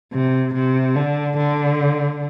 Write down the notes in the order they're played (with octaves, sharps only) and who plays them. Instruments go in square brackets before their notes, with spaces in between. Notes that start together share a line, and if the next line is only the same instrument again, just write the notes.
[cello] C3
C3
D3
D3